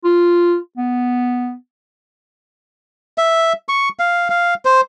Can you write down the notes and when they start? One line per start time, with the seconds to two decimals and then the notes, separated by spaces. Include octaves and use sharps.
0.04 F4
0.78 B3
3.18 E5
3.69 C#6
3.99 F5
4.30 F5
4.65 C5